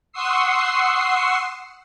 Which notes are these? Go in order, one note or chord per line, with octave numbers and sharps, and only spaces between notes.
F#5 C6 C#6 D#6 E6 C7